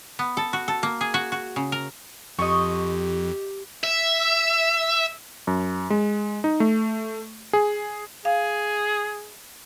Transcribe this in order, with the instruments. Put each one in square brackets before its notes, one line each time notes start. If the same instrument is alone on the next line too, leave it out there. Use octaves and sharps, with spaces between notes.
[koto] B3
A4
F#4
A4
A#3
G#4
F#4
F#4
C#3
A#4
[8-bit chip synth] F2 [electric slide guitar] F3 [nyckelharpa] G4 [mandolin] D#5 C#6
[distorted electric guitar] E5
[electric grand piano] F#2
G#3
D#4
A3
G#4
[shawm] G#4 [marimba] F5